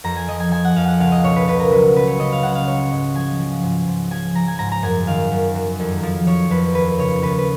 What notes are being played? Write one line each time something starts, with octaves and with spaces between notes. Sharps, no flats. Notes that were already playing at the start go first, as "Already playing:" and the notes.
F2 A#5
G#5
F3 D#5
G#5
F3 G#5
F#5
F2 F5
F#5
C#2 F5
D#5
B2 C#5
B4
C#2 B4
A#4
F#3 B4
C#2 B4
C#5
C#3 D#5
F5
C#2 F#5
F5
F#3 C#5
G#2 D#5
F3 G#5
F3
G#2
G#2
F3 G#5
F3 A#5
G#5
G#2 A#5
A#5
F#2 G#5
D#3 F5
F#2
F#3
F2
F3
F3 C#5
F2 B4
D#2 B4
C#3 C#5
D#2 B4
B4